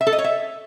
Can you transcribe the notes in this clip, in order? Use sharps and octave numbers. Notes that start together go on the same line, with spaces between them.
E5
A4
D#5
C#5
E5